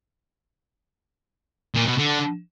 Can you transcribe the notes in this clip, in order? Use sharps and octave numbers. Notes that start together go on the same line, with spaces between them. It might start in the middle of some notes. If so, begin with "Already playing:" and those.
A#2
B2
D3